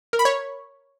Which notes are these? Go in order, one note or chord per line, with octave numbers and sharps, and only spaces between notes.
A#4
B5
C#5